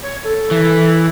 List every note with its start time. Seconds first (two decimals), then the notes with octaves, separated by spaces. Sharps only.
0.02 C#5
0.24 A4
0.51 E3